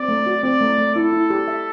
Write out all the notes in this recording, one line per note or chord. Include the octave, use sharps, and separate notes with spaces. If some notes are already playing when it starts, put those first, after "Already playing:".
Already playing: C4 D5
A3
F#4
C4 D5
A3
A3
E4 A4
E4
G4
E5